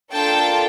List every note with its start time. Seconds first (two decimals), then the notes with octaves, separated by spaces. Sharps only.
0.13 A#3 D4 F4 A4 G5 A5